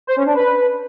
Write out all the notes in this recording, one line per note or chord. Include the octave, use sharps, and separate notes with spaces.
C5
C#4
D4
B4